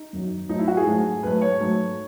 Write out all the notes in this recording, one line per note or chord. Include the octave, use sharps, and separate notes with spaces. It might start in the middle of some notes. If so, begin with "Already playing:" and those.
Already playing: D#4
F#2 D#3 F#3
G#2 F#3 A3 D#4
E4
F#4
G#4
G#2 F#3 A3
G#2 F#3 A3 B4
C#5
G#2 F#3 A3